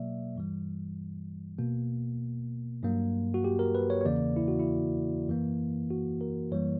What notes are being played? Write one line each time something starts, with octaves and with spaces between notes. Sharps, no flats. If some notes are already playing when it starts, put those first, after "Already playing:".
Already playing: B2 F#3 A#3 D5 E5
G2 E3 G3
B2 A#3
G2 F#3 A#3
F#4
G4
A#4
B4
C#5
C#5
E2 C#3 E3 A#3 D5
E4
F#4
E4
F#2 E3 A#3
F#4
A#4
F#2 E3 G3 A#3 C#5